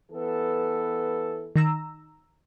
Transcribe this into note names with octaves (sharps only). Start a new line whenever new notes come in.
E3 B3 A4
D#3 A#5 E6